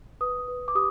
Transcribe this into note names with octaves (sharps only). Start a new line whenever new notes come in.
B4 D#6
B4
D6
G4 D#6